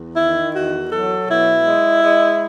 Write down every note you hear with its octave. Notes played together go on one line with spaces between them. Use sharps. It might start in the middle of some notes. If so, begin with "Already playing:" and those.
Already playing: E2
D#3 E4
E2 F#4
F#3 A4
B2 E4
G#3
G#3